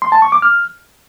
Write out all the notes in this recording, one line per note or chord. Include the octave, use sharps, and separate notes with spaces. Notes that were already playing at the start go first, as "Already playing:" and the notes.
C6
A5
C#6
D6
F6